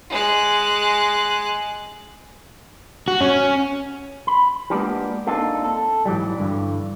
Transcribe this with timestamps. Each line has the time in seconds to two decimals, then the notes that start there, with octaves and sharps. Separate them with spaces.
0.10 G#3 F#6
3.08 F#4
3.21 C#4
4.27 B5
4.70 G#3 A#3 B3 D4 F4 G4
5.27 A#3 C4 D4 D#4 F4 A4
5.64 A4
6.06 G#2 E3 F#3 G3
6.38 G2 D3 E3